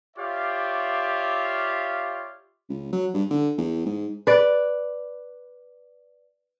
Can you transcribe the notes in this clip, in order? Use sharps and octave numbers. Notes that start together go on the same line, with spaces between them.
F4 G4 C#5 D5 E5 F5
C#2
F#3
G2
D3
E2
G#2
B4 D5